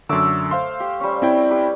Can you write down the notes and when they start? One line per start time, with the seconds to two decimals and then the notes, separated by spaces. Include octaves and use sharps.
0.09 F#2 D3 A3 D6 E6
0.51 C5 F5 C6
0.80 G4
1.00 G3 C#4
1.22 C4 E4 G5
1.51 G4 B4